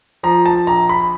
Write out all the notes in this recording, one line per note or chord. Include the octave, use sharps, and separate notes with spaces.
F3 A#5
A5
A#1 A#5
B5